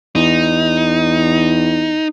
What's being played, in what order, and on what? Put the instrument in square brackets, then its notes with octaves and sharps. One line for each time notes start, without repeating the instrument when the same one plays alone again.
[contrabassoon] E2 [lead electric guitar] D#4